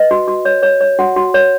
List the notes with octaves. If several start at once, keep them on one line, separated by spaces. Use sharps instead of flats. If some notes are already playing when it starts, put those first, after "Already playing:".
Already playing: B4 D#5
F#4
F#4
C#5
C#5
C#5
F#4 F#5
F#4
C#5